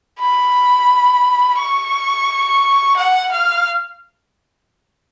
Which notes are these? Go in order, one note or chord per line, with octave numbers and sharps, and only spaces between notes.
B5
C#6
F#5
F5